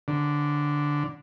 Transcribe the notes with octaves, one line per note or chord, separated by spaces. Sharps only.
D3